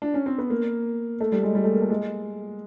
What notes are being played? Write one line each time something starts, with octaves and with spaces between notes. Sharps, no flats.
D4
C#4
C4
B3
A#3
A3
G3
G#3
G3
A3
A#3
A3
G#3